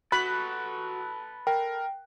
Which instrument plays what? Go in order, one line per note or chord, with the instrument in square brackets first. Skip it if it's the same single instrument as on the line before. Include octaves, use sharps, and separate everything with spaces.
[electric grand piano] F#4 F#6 [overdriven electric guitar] A4 B4 [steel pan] B5
[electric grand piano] A#4 [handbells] G5